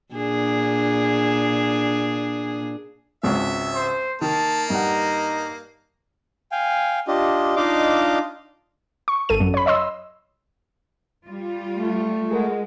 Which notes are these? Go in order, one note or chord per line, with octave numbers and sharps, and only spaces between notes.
A#2 D4 G#4
G#1 C#2 E5
C5
D#3 A#3 A5
G2 D#4 F#5
F5 G5 G#5
D4 F4 G4 D#5
D4 D#4 F4 D#5 F5 D6
C#6
G#1 A4 D#7
F#2 F#3
C#5 B5
C#5 D#5 C6 E6
G3 F4
A3
G#3 G#4 A#4 F#5